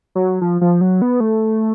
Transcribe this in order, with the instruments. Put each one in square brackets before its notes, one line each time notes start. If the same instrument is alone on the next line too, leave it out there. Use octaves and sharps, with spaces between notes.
[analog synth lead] F#3
F3
F3
F#3
B3
A3